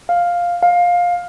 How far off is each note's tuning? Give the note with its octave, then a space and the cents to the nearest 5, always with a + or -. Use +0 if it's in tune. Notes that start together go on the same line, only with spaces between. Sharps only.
F5 +5
F5 +15